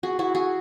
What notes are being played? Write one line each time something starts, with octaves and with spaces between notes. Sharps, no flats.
F#4 G#4
E4 F#4
F#4 G#4